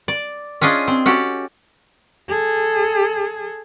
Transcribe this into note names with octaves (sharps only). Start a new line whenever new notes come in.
D5
C#4 D4 F4 G#4 D#5
C4
C#4 F#4 G4 A4
G#4 A4